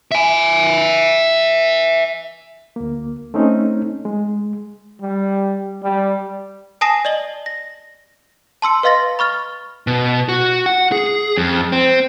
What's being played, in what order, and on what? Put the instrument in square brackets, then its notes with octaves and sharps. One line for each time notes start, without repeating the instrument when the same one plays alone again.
[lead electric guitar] E5 G#5
[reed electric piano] D2 A#3
A3 C4 C#4 D#4
G#3
[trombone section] G3
G3
[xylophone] G#5 A5 D#6 A#6 C7 E7
D5 D#5 F#7 G7
A#6
A5 C6 E6 C#7
B4 D#5 F5 C6 A6 A#6
B5 C#6 F6 A6
[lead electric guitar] B2
F#4
F#5
G#4
F2
C4